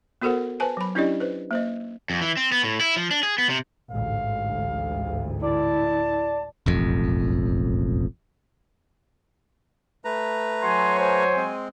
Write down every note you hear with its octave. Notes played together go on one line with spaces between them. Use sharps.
B3 F#4 A4 A#4 C5 F#5
B4 C5 G#5 A5
F#3 B5
C#4 D4 E4 G4 D5 D#5
B4 C5
A#3 C5 D#5
F2
E3
C4
B3
A2
E4
F3
D4
G#4
B3
C3
A1 D2 G#2 F5
E4 D5 A5
E1 A1 F2
A3 B4 A#5
F#3 C#5 G#5 C6
C5
G#3 C4